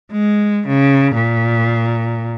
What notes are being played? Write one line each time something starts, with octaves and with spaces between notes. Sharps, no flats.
G#3
C#3
A#2